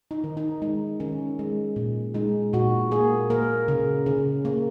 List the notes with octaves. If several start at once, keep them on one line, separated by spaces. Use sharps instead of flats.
D#4
D#3
D#4
G#3 D#4
D#3 C#4
G#3
A#2
G#3 D#4
A#2 F#4
A#3 G#4
A#3 A#4
C#3
C#3
A#3